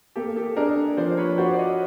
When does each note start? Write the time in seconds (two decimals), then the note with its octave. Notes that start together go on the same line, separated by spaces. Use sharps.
0.16 A#3 G4 A4
0.36 G4 A4
0.56 D4 G#4 A#4
0.97 F3 C5 D5
1.17 B4 C#5
1.38 F#4 C5 D5
1.54 D5
1.59 C#5 D#5